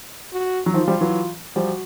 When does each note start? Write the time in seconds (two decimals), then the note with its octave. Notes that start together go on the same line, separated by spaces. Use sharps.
0.33 F#4
0.66 F#3
0.74 D#3 F3 F4
0.88 F3 G3
1.01 E3 F#3
1.56 F3 G3 F#4